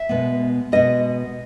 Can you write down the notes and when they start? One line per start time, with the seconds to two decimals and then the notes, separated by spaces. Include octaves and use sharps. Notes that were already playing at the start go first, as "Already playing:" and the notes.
Already playing: E5
0.09 B2 G#3 B3
0.72 B2 G#3 B3 D#5